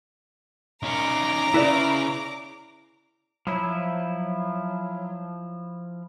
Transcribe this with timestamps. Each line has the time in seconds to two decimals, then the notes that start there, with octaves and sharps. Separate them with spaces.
0.83 D#3 C#4 A#5 D6
1.54 C#3 E4 B4 D5
3.47 F3 F#3 E4